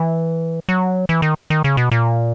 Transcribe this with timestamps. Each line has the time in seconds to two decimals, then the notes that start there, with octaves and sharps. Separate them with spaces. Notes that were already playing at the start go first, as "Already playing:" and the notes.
Already playing: E3
0.69 F#3
1.09 E3
1.22 D#3
1.50 D#3
1.64 C#3
1.77 B2
1.91 A#2